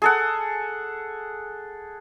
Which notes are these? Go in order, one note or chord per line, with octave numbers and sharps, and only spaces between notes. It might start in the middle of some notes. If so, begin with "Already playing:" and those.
G#4 A4 F#5